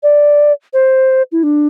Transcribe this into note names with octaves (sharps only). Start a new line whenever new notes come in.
D5
C5
E4
D4